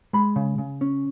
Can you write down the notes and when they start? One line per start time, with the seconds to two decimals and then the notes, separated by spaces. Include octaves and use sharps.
0.13 G#3 B5
0.36 C#3
0.58 C#3
0.81 C#4